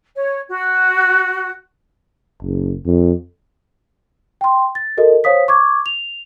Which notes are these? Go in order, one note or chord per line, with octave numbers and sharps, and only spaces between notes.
C#5
F#4
F#1
F2
G5 C6
A6
F#4 A4 A#4 D#5
C5 C#5 F5 D#6 B6
C#6 D6 G#6
F7